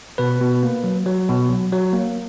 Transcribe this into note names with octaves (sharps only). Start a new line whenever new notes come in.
B2 B4
B2
A#3
F#3
F#3
B2
F#3
F#3
A#3